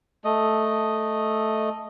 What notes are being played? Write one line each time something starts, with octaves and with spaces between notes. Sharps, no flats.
A3 D#5